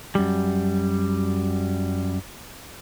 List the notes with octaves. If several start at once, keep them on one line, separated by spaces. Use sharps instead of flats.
F#2 G3